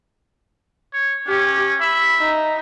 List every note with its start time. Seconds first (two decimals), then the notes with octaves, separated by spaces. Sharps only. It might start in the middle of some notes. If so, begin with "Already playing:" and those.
0.93 C#5
1.28 C#4 G4
1.81 E5 B5
2.18 D#4